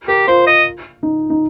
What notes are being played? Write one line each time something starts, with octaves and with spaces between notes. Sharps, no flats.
G4 A#4
F4 C5
D#5
D#4
D#4